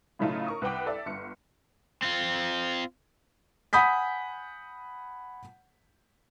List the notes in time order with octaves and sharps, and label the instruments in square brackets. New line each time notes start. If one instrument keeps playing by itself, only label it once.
[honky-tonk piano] A2 C#3 F#3 A3 D#4 F4
A#4 C#6 D#6
C2 B4 F#5 G5 D6
A4 D5 E5
G1 C#7
[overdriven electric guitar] C4 F4
[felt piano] F#5 G#5 B5 D#6 G6 B6